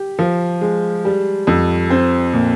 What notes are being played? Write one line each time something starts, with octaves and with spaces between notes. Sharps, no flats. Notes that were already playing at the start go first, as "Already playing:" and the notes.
Already playing: G4
F3
G#3
G3
F2
C4
A#2